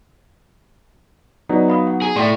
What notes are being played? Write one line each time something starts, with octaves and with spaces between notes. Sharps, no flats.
F#3 B3 D#4 D5
F5 B5 D#6
F#5
G#4
A2 A3 D5 G5 C6